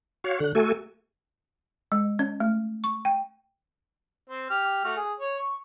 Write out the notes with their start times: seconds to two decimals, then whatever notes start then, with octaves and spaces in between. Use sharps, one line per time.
0.24 F#4 C#5 F5
0.40 D3 F#6
0.55 A3 F#4 A4 G#5
1.92 G#3
2.19 C#4
2.40 A3
2.84 C#6
3.05 G5
4.29 C4
4.50 G4 F6
4.85 A3 F#4 F6
4.97 G#4
5.20 C#5
5.39 C#6